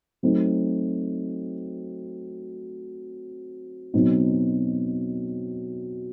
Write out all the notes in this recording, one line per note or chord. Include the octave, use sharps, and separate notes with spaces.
F#3 A3 C4 D#4
B2 F#3 C4 D#4